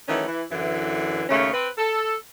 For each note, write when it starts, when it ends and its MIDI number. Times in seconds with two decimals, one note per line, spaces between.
0.07 0.25 51
0.07 0.25 52
0.07 0.25 54
0.07 0.25 57
0.07 0.25 61
0.27 0.43 52
0.50 1.22 42
0.50 1.22 50
0.50 1.22 52
1.29 1.52 39
1.29 1.52 49
1.29 1.52 57
1.29 1.52 61
1.52 1.68 60
1.52 1.68 71
1.77 2.15 69